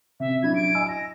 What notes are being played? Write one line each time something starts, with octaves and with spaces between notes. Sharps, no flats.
C3 E5
F#3 D4 E4 G#6
D7
D#5 G#5 E6
A#6